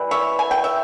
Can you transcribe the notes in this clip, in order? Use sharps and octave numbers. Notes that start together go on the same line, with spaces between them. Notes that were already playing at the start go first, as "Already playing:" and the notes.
Already playing: E3 G3
C#5 E5
G#5
G5
E5